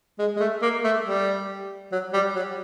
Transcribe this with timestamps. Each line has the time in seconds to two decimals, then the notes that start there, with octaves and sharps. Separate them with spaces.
0.19 G#3
0.37 G#3
0.40 A3
0.62 A#3
0.84 A3
1.05 G3
1.92 F#3
2.14 G3
2.36 F#3